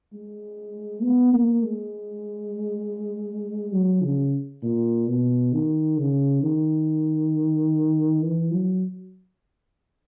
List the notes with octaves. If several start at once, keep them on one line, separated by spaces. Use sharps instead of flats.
G#3
B3
A#3
G#3
F#3
C#3
A#2
B2
D#3
C#3
D#3
E3
F#3